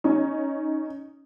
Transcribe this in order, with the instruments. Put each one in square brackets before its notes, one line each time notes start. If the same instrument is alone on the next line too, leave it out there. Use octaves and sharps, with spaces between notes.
[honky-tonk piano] C#4 D#4